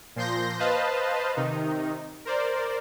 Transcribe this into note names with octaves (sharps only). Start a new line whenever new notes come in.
A#2 F3 C6 G6 A#6
B4 C5 D#5 F5 A5
C3 D#3 D#4
A#4 C5 D5